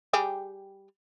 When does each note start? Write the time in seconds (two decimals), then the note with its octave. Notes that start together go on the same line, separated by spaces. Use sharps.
0.13 G3 G4 G#4